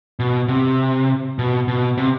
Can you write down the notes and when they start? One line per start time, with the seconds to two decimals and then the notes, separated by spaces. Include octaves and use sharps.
0.19 B2
0.48 C3
1.39 B2
1.68 B2
1.97 C3